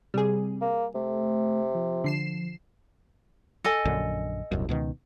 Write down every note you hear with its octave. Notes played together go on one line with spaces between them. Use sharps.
C3 G3 G#4
A#3
C3 A3
F3
D3 C7 E7
A4 D#5 G#5
A#1 F#2 D3
D#1 C2 F#2
C#2 B2 D#3